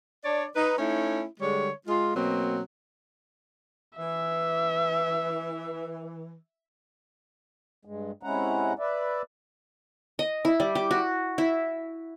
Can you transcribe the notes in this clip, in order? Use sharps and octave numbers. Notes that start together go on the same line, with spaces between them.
D4 C#5 D5
D#4 B4
A3 C#4 D#4 E4
D3 G3 G#3 C#5
G#3 F4
B2 F#3 A#3 C4
E3 E5
G2 G#3
C3 G#3 C#4 E4 F#5 A#5
B4 D5 E5
D#5
E4
G3
G4
F#4
E4